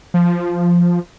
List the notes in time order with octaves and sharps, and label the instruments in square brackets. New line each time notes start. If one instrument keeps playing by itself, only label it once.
[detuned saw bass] F3